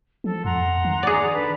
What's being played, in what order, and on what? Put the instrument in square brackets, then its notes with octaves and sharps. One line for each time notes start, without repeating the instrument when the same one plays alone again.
[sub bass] F3 [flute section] A4
[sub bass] F2 [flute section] F#5 A#5 C6
[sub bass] D#3
[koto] G#4 D5
[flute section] D4 A4 B4